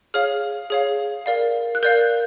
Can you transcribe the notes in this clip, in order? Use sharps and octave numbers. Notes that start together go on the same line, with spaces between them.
G#4 C#5 F5 F6
G#4 C#5 F5
A#4 D5 F5
F#6
A#4 D5 F5 G6